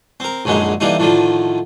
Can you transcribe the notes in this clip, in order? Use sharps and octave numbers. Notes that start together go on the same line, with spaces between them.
C4 A#4
A#1 F#2 D3 G#3 D#4
D3 E3 G3 A#3 D#4
A2 D3 D#3 F3